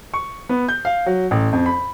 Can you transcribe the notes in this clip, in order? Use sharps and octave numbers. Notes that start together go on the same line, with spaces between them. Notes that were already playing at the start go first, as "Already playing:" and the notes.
C#6
B3
G6
F5
F#3
A1
F2
B5